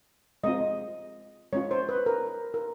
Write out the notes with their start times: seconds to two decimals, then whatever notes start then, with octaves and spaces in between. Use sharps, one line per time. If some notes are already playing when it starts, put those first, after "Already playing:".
0.44 G#3 C4 F4 D#5
1.53 G#3 C#4 F4 C#5
1.71 C5
1.89 B4
2.06 A#4
2.54 A#4